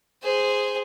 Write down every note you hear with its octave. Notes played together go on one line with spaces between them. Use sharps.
G#4 C5